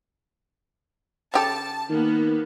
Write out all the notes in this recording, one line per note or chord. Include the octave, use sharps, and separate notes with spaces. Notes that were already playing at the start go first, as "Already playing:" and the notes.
C#3 G4 A4 A5
D#3 A#3 B3